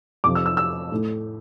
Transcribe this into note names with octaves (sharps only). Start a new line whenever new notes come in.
F2 C3 F3 D6
E6
E6
E6
A2